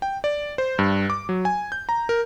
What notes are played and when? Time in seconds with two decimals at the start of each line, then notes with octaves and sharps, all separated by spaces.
0.02 G5
0.24 D5
0.58 C5
0.79 G2
1.10 D6
1.29 F#3
1.45 G#5
1.72 G6
1.89 A#5
2.09 A#4